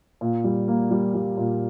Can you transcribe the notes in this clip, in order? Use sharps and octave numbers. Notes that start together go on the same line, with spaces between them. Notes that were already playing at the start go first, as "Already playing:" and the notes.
A#2
G3
A#3
G3
G3
A#2